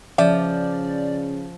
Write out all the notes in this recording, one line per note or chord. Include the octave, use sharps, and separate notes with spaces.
C#3 F3 D5 E5